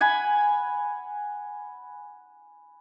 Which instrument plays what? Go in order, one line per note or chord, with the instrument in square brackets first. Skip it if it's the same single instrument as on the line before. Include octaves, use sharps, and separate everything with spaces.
[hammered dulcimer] F#5 G#5 B5